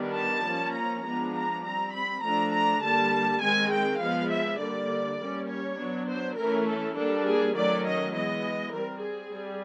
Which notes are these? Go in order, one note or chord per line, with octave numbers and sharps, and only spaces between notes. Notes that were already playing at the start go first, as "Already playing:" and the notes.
Already playing: D#3 G3 B3 D4
A5
F3 A#3 C#4
A#5
F3 G#3 B3 D4 A#5
A#5
G3 C4 A#5
B5
F3 A3 D4 A#5
A#5
D3 G3 A#3 A5
D#3 G#3 C4 G#5
G5
F3 G#3 B3 F5
E5
D3 G3 A#3 D5
G3 A#3 C#4
C#5
F#3 B3 D4
C5
E3 A3 C#4 A#4
A4
G3 A#3 D4 A4
G#4
D#3 F#3 A3 C#4 D5
D#5
E3 G#3 B3 D#5
G3 C4 A#4
G#4
G3